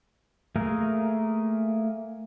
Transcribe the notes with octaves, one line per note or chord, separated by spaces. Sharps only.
A3 A#3 G#4 A#4